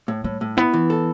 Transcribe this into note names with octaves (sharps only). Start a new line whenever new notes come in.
A2
A2 G3
A2
B3 E4
E3
A4